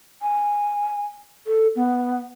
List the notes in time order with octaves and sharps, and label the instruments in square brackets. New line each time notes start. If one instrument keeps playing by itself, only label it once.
[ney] G#5
A4
B3